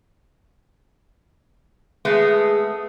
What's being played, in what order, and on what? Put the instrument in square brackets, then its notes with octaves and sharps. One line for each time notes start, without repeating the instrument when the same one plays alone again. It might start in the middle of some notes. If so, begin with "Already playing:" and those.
[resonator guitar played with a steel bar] G#3 A3 B3 [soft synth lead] G#4